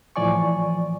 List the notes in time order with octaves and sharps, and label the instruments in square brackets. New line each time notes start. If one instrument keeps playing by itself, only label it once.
[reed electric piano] A2 E3 F3 D5 G#5 C#6